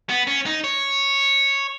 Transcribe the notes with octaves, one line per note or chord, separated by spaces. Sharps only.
B3
C#4
D#4
C#5